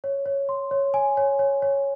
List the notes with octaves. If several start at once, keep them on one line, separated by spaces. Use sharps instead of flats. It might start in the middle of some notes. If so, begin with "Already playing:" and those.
C#5
C#5
C6
C#5
G#5
C#5
C#5
C#5